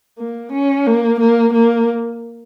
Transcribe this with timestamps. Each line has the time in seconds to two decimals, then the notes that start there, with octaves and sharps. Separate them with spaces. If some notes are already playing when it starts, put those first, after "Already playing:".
0.19 A#3
0.52 C#4
0.87 A#3
1.20 A#3
1.53 A#3